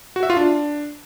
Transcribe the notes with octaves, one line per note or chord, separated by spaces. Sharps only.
F#4
E5
F4
D4